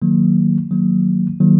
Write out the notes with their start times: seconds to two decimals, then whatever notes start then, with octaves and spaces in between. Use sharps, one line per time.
0.02 D#3 F#3 A#3
0.71 D#3 F#3 A#3
1.40 D#3 F#3 A#3